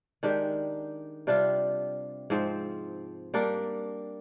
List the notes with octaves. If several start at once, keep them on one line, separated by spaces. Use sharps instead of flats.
D#3 G#3 D4 G4
C3 G3 D4 F4
G#2 F3 C4
G3 A#3 D4